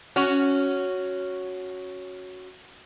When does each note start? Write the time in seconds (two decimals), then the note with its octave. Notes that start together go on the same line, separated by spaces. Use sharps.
0.16 C#4 F#4